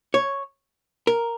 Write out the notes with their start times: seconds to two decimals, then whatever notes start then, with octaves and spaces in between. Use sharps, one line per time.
0.14 C#5
1.07 A#4